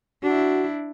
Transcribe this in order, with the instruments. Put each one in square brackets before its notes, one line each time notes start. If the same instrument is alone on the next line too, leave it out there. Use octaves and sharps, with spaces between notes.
[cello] D4 E4 [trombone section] F#4